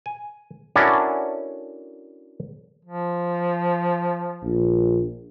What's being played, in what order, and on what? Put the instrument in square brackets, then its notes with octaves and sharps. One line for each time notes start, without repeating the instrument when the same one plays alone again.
[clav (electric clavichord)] G#5
C#4 D4 E4 F#4 A4 A#4
[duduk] F3
[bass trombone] A#1